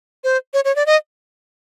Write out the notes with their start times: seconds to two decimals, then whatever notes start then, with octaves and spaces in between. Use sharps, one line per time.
0.24 C5
0.54 C#5
0.65 C#5
0.76 D5
0.86 D#5